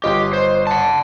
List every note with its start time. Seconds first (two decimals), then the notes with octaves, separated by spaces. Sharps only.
0.04 G1 F4 G4 D#5 G5
0.33 C5
0.67 F#5 A5